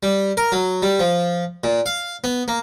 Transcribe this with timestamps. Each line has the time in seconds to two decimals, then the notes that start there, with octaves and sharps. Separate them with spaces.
0.03 G3
0.37 A#4
0.52 F#3
0.82 G3
1.00 F3
1.64 A#2
1.86 F5
2.24 B3
2.48 A#3